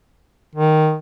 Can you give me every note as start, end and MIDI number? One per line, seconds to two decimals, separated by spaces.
0.55 0.95 51